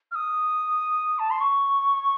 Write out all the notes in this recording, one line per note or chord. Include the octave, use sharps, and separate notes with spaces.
F6
D#6
A5
C6
C#6